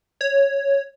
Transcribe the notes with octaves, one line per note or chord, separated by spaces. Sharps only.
C#5